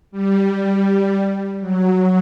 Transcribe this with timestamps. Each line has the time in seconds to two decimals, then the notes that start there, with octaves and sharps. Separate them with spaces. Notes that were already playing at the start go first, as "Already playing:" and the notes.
0.11 G3
1.60 F#3